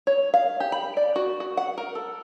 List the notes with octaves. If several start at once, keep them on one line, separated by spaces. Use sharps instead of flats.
C#5
F5
G4
B5
D5
F#4
F#4
F#5
A#4
A4